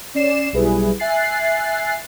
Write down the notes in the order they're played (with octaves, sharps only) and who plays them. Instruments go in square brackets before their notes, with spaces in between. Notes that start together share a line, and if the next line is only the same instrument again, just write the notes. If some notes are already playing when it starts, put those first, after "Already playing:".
[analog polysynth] C#4 D5 C7 E7
B1 G3 E4 G#4 B4
E5 G#5 F#6 A6 C7